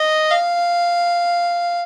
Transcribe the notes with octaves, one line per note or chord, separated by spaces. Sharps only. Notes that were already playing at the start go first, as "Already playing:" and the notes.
Already playing: D#5
F5